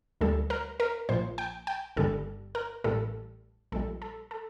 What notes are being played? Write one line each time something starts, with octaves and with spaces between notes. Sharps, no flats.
D2 D3 G3 A4
A#4
A#4
A#1 A#2 F3 C5
G5
G5
G1 G2 D3 G3 A4
A#4
A1 A2 G3 A4
A#1 A#2 G3 A4
A4
A4